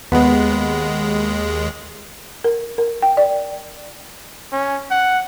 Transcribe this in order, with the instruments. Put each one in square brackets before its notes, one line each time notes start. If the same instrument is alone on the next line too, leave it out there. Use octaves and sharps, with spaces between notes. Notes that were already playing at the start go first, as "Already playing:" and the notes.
[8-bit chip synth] D#2 G#3 [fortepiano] B3
[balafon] A#4
A#4
G5
D5
[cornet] C#4
F#5